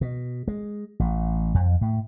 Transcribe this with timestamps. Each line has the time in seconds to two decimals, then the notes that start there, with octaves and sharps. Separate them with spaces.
0.01 B2
0.48 G#3
1.00 A1
1.54 F2
1.81 A2